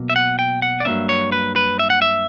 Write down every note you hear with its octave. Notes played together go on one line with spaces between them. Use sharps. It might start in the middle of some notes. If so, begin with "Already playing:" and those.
Already playing: B2 F#3 A#3
E5
F#5
G5
F#5
D5
G2 F#3 A#3 C#4 E5
C#5
B4
B4
E5
F#5
E5